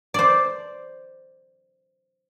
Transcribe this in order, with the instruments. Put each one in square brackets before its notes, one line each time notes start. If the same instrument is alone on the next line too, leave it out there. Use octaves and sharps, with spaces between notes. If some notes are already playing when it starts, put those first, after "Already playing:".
[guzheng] C5 D5